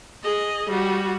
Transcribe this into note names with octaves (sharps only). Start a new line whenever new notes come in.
G#4 D#5
G3 F#4